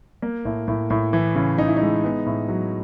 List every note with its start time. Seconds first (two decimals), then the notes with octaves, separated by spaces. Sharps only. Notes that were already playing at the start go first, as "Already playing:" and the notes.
0.22 A#3
0.45 A2
0.68 A2
0.90 A2
1.13 E3
1.35 C#3
1.58 C#3 D#4
1.67 E4
1.77 G#3 D#4
2.04 B3
2.26 A2
2.49 F#3